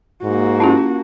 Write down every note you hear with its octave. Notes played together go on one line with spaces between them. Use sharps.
G#2 A#3 F#4
C#4 E4 F4 G4 A5